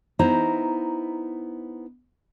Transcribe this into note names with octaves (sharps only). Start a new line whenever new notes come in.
B3 D#4 E4 C5 A#5